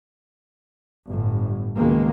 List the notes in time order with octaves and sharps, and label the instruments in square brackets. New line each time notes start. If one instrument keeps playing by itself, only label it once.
[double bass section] G1 A2
C#2 B2 D#3 G#3 A#3